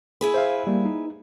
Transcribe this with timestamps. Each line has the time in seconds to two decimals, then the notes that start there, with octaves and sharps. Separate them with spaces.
0.21 E4 G#4 B4
0.34 C5 E5 F5
0.67 G3 A#3
0.85 D#4